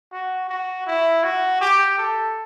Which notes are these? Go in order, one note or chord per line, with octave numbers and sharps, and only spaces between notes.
F#4
F#4
E4
F#4
G4
A4